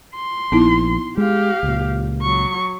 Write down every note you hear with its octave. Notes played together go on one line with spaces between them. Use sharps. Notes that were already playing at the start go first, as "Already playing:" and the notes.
C6
A#1 B3 D#4 E4
G#3 G4 F5
C#2 A#2
F#3 C#6